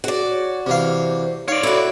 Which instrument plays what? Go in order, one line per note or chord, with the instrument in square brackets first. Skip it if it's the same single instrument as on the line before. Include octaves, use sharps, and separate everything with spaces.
[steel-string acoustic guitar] F#4 D5 [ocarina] G#4
[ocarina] C#5
[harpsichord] C3 E3 F5 [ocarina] C5
[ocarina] D#4 [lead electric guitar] C#5 D5 [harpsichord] F5
[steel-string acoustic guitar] E4 F#4 [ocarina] A4